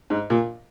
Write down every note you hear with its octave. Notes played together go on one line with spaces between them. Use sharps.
G#2
A#2